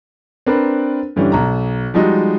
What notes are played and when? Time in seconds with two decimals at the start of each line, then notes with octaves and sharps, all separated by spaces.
0.47 C4 D4 A#4 B4
1.16 G2 D3 E3 G3 C#4 D4
1.32 B1 A#5
1.94 F3 G3 G#3 D#4 F#4